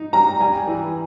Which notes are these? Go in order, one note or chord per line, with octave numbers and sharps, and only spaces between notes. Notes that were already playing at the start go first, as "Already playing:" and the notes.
Already playing: D#4
G3 A#5
G3 G#5
E3